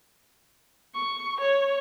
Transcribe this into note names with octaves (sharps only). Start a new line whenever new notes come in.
C#6
C#5